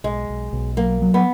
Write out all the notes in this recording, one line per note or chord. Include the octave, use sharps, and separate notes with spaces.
B1 G#3
B1
B1
F#3 A#3
F#3
B3